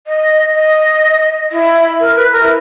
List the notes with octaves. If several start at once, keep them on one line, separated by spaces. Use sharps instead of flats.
D#5
D#5
E4
A#4
B4
A#4
E4